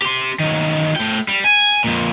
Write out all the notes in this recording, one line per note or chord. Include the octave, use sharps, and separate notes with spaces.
G4 C6
D#3 F#3
A3 G5
G3
G#5
F2 A#2